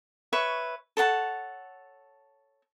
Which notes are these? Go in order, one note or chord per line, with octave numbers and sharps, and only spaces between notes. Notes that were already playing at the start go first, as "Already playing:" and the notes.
B4 C#5 E5 C#6
A4 C#5 F#5 A5